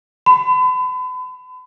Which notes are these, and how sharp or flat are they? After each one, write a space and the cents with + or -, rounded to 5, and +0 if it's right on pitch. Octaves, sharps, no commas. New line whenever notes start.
B5 +40